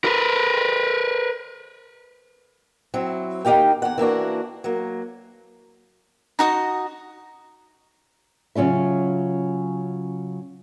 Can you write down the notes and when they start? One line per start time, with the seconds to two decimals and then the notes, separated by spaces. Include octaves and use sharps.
0.04 A#4 B4
2.94 F#3 C4 E4
3.45 D#2 D#3 D#4 G4 F5 G5
3.82 E2 F#5
3.98 E3 A#3 D4 F#4
4.64 F#3 A#3
6.39 D#4 F#4 D#5
8.55 C#3 F#3 C#4 F4 E5